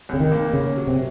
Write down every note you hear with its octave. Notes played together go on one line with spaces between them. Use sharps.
C2 C#3
D#3
A#3
C#3 C#4
F#3
C3